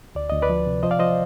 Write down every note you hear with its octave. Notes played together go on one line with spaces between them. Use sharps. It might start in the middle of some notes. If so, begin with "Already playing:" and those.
D2 D5
D2 D#5
B4 D5
F3
C3
F3 C5 D#5
D5 F5
F3 C5 D#5